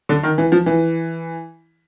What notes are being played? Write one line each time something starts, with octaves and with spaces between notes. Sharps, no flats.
D3
D#3
E3
F3
E3